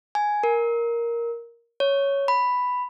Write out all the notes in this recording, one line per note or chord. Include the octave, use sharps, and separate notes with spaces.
G#5
A#4
C#5
B5